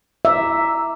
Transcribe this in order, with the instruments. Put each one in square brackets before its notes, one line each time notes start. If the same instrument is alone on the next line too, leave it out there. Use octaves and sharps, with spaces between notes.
[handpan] E5 [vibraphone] A#5 D6 E6